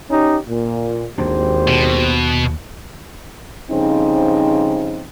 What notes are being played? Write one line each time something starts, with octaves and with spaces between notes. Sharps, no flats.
C#4 D#4 G4
A#2
G#1 D#2 A#3 D4 G4 C5
B2
G2 C#3 F3 C4 D#4